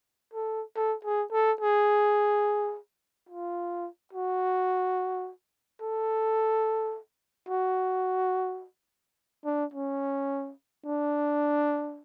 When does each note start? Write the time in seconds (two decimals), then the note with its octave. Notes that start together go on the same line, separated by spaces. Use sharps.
0.34 A4
0.76 A4
1.05 G#4
1.32 A4
1.61 G#4
3.29 F4
4.13 F#4
5.82 A4
7.49 F#4
9.45 D4
9.74 C#4
10.86 D4